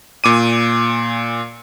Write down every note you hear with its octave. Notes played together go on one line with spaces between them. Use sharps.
A#2 D6 D#7